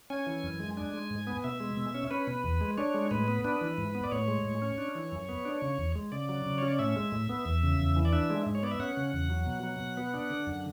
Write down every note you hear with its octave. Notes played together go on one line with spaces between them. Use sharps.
C#4 G#5
E3
F#2
G#3
D4 G#5
G#3
G#2
B3
B2 E5
G#3
B2
C#4
C#4 B4
B2
E2
G#3
D4 C#5
G#3
A2 B4
B3
D4 B4
E3
G#2
B3
D5
A2 C#5
G#3
A2
C#4
D4
E3
F#2
B3
D4
C#3
E2
G#3
C#3 D5
F#3
C#3
C#4 C#5
D5
A2 E5
G#3
A2
B3
E2
C#3
E2
E3
D5
D4 E5
G#3
G#2
C#5
B3 D5
E5
C#4 F#5
C#3
E2
F#3
B2
F#3
B2
B3
D4
D3
F#2